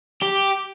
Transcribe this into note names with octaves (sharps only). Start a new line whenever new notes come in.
G4